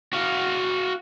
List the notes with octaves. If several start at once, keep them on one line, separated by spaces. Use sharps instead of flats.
F#4 F5